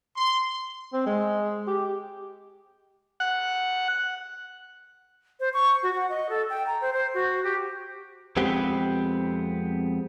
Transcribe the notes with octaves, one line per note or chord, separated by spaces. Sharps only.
C6
C4
G#3
G4
F#5
C5
C#6
F#4
F#5
D#5
A4
G5
A#5
C5
C5
F#4
G4
F2 G#3 B3 C4 G4 B4